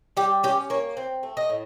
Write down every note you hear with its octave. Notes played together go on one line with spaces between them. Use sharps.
G3 G4
C#4 G4
A#3 C#5
C4
A3
D#5
A2